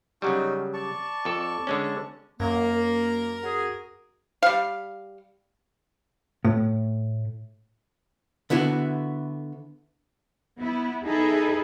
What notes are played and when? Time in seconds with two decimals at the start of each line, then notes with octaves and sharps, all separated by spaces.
0.22 C#3 F#3 G3 C#4 D#4 F#4
0.74 D5 A5 C#6
1.25 F2 A4
1.67 D3 G#3 C#4
2.40 F#2 A#3 A#4
3.43 F#4 G#4
4.43 G3 F5
6.45 A2
8.50 D3 B3 E4 F#4
10.59 B3 E4
11.05 D#4 E4 G#4 A4 B4